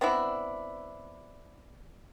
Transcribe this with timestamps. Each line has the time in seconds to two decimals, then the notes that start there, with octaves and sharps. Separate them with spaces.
0.01 B3 C4 D4 E4